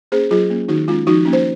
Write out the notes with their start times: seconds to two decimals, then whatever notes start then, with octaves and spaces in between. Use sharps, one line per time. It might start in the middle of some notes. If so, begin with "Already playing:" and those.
0.12 A#3 C#4 G#4 C5
0.31 F#3 F4 G#4
0.50 A#3 C#4
0.68 D#3 D#4 F#4
0.88 G#3 C#4 F4
1.07 F3 D#4 F#4
1.25 A#3 C#4
1.33 C5